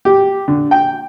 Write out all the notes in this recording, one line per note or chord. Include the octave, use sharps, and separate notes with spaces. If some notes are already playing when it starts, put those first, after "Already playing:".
G4
D3
G5